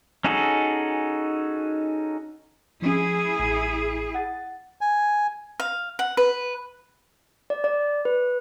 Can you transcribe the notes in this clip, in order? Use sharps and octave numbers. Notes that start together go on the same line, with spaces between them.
C#4 D#4 F#4 G#4 A4
F3 C#4 E4 G#4
A1
F#5 A6
G#5
F5
F#5
B4
D5
D5
B4